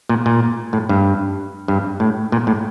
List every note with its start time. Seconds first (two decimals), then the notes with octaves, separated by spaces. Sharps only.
0.09 A#2
0.26 A#2
0.73 A2
0.89 G2
1.68 G2
2.00 A2
2.32 A#2
2.47 A2